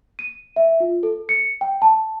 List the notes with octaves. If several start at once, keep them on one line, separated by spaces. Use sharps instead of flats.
D#7
E5
F4
A4
C#7
G5
A5